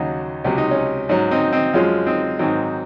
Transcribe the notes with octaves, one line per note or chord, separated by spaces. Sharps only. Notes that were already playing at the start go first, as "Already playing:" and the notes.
Already playing: D#2 C#3 F#3 D#4 F#4
C#2 C3 F#3 C#4
D#4
C#4
G#2 F#3 C#4
C4 D#4
C4 D#4
F#2 F3 G#3 C#4 F4
C4 D#4
G#2 D#3 F#3 C4 D#4